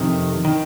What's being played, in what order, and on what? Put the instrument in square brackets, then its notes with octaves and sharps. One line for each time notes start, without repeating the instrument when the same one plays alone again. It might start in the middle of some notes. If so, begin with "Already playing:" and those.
Already playing: [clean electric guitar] F2 C3 D#3
D#3